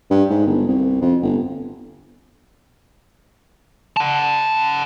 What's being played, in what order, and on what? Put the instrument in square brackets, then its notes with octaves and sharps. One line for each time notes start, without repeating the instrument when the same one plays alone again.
[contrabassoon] G2
G#2
G1
C2
F2
G1
[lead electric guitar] F#5 A5